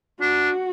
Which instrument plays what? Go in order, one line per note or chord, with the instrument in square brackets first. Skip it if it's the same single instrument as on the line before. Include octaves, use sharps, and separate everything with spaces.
[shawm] D4 [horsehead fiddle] F#4